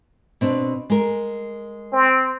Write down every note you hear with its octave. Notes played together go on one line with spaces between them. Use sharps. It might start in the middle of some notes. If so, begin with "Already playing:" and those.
B2 C4 D4
G#3 A#4
C4